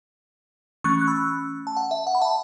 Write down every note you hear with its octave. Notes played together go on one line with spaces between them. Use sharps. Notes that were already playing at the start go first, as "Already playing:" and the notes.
E3 A3 C#4 C#6 F#6
F#6
B5 E6
A5
F#5
E5
F#5
B5
E5 A5